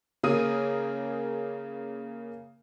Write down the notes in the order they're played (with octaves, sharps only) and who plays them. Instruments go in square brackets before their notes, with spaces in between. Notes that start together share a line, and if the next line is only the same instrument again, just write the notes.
[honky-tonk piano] C#3 A#3 G#4 D#6 D#7